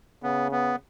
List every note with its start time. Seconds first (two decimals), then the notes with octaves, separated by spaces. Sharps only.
0.23 C#3 B3
0.52 B3